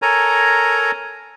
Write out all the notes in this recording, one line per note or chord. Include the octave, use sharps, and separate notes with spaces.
A4 A#4 C#5 G#5 A#5